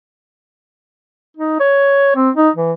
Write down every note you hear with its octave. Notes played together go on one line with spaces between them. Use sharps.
D#4
C#5
C4
D#4
E3